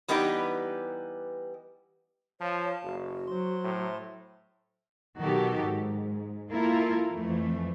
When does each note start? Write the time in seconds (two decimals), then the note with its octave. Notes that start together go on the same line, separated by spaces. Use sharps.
0.08 E3 G3 B3 D#4 G4 B4
2.41 F3 C#5 F5 A5
2.83 F#1 F#4
3.27 F#3 C5 C6
3.64 A2
5.21 B2 D#3 F#3 F#4 G4 A4
5.61 G#2
6.51 A#3 E4 F4 A4 A#4
7.13 F2 E3 F3 A3